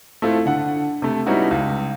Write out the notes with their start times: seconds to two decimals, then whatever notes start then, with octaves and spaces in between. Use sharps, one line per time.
0.22 A3 C4 E4 F4 A4
0.45 D3 F#5
1.02 C3 A3
1.26 G3 B3 C#4 D#4 E4 F#4
1.51 C#2